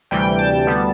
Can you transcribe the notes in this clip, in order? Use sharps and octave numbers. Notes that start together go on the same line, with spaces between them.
D2 C3 E3 G3 G5
A5
D2 D3 G3 B3